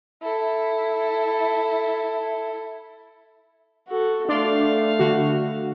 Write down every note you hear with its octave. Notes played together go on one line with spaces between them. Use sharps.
E4 A4
F#4 A4
A3 D4 D5 F5 C6
D3 F#4